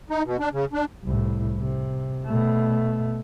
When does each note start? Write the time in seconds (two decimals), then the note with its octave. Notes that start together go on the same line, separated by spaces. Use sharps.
0.10 D#4
0.25 B2
0.40 D4
0.53 C#3
0.73 D4
1.04 C2 A2
1.58 C3
2.27 B2 A3